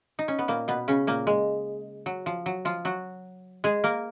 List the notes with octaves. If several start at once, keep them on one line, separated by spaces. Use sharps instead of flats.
D#4
C#4
B3
A#2 A#3
B2 B3
C#3 C#4
A#2 A#3
G#3
F#3
F3
F#3
F3 F4
F#3 F#4
G#3 G#4
A#3 A#4